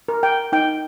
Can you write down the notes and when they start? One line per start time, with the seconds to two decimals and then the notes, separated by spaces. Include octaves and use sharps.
0.08 A#4
0.23 G5
0.52 D#4 G5